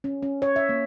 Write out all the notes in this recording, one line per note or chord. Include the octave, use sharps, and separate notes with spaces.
C#4
C#4
C#5
E5
A#3